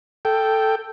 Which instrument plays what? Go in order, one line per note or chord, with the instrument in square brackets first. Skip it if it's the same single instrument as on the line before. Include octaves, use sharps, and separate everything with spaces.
[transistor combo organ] A4 G5